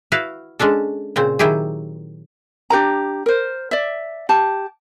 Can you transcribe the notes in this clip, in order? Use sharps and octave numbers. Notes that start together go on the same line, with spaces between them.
E4 F#4 B4 F5
G#3 C#4 D4 A4
A#2 C#3 C4
D#3 F#3 E4 G4 G#4
D4 G4 A#4 A#5
A#4 C5
D5 E5
G4 A5